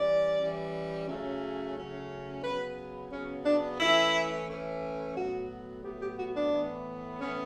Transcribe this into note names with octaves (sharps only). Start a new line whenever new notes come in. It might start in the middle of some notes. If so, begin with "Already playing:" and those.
Already playing: E3 G3 C#4 D5
E3 G3 C#4
C#3 F#3 A3 C#4
C#3 F#3 A3 C#4
C#3 F#3 B3 B4
C#3 F#3 B3 C#4
D4
E3 A3 C#4 E4
E3 A3 C#4
A2 F#3 B3 F#4
A2 F#3 B3 G4
G4
F#4
D4
A2 E3 B3
A2 E3 B3 C#4